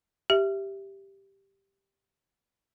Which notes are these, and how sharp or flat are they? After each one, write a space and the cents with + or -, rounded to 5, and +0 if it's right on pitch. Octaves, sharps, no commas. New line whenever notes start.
G4 +0 E5 +5